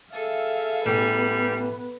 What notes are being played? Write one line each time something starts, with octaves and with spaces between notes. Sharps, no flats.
G#4 A4 E5 F5
A1 G3 B3 B4